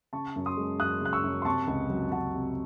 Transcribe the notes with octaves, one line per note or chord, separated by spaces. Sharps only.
C#3 A5 C#6
F#2
C6 D#6
G#3
F#2 D#6 F#6
C#3 F#6
C#6 E6
F#2
C6
C3 A5 C#6
C#2
F#3
C#2 F#5 A5
C3